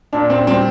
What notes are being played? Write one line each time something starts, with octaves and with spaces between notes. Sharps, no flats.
A#2 D4
C4
G3 C4